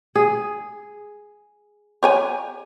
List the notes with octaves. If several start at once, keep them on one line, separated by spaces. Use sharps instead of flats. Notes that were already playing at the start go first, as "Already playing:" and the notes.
G#4
G4 C#5 G#5